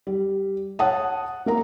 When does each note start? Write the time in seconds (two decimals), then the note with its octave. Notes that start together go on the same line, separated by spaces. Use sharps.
0.07 G3
0.79 C#5 F#5 A5 D#6
1.46 A#3 A#4 A#5